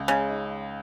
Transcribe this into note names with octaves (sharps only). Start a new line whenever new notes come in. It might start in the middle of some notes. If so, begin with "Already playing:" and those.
Already playing: C#2
C#3 G#3
D#4